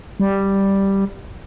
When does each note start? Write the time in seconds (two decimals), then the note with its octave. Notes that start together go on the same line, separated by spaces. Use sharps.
0.20 G3